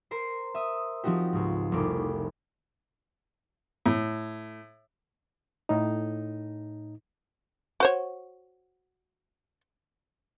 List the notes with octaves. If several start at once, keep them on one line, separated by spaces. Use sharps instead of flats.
A#4 C5 C6
E5 D#6
F3 C4 D#4 F#4 G4
C#2 G#2
F1 C2 A3 D6
A2
A2 D#4
F#4 C5 C#5